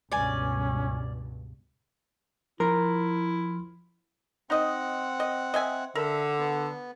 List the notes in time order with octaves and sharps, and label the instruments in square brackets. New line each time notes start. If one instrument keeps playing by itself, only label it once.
[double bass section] C#2 G2 B2 [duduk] C#4 [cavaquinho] D5 G#5
[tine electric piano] F3 C6 F6 [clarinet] E4 [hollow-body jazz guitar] A#4
[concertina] C4 F#5 [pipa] D#4 D#5
[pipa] D#5
D#5 E5 G#5
[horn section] D3 [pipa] A#4 [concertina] E5
[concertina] B3